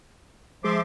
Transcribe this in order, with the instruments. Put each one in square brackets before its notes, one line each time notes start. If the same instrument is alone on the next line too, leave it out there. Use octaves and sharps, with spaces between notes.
[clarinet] F3 [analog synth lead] G#3 [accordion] E5 C6 D6